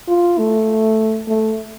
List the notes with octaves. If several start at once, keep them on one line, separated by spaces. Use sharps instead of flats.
F4
A3
A3